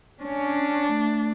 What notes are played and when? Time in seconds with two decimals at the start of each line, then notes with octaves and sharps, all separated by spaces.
0.23 C#4 D4
0.93 A3